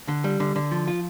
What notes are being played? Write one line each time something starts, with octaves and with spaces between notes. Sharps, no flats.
D3
G3
D3
D3
F3
F4